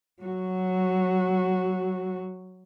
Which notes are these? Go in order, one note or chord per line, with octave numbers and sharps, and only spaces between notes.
F#3 F#4